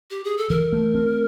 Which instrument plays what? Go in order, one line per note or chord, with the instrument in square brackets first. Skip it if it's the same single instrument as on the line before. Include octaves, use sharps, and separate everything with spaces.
[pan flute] G4
G#4
A4
[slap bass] E3 [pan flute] A#4
[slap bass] A3
C4